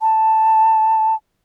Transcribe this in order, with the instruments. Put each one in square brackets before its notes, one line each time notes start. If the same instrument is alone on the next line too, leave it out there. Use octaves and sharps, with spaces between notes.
[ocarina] A5